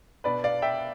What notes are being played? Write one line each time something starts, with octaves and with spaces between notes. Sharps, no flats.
B2 B3 D4 B4 D5
D5 F5
E5 G5